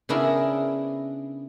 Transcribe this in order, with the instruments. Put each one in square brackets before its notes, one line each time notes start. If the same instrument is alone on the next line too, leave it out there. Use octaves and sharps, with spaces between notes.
[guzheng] C#3 B3 D4 E4 G#4 A#4